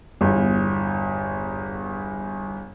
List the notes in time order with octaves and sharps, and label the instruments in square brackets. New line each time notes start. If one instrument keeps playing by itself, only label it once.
[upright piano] G1 E2